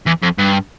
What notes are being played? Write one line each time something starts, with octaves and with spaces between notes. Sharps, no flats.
E2
F2
G2